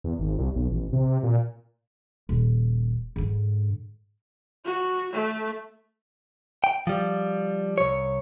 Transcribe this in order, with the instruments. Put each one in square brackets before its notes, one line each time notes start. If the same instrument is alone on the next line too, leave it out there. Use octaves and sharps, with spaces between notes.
[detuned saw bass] E2
G#1
C2
B1
A1
C3
A#2
[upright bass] D#1
G#2 D3
[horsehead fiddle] F#4
A3
[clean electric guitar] G5
F3 G3
C2 C#5